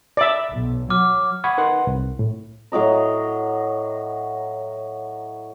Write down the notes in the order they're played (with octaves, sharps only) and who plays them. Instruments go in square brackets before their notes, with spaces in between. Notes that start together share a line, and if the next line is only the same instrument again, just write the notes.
[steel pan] D5 E5
[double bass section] B1
[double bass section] F#3 [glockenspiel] D6 F6
[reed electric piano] F#5 B5 C#6 D#6 G#6
D#4 A#4 B4 F#5 C6
C2
A2
[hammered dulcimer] A2 F#3 D#5 A#5